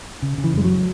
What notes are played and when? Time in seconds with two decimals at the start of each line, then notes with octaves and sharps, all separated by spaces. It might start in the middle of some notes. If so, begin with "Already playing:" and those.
0.22 C#3
0.38 C#3
0.44 E3
0.54 F#2 G#3
0.64 F#3